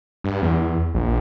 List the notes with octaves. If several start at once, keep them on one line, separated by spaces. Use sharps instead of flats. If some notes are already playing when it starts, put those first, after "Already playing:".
G2
E2
A#1